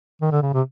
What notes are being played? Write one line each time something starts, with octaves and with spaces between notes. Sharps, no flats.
D#3
D3
C#3
C3